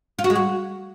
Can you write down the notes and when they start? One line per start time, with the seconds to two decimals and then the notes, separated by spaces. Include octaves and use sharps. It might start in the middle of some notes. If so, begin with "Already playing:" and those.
0.19 F4
0.24 F#4
0.30 G#3
0.35 F#4